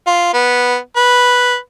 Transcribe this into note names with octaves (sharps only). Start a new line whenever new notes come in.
F4
B3
B4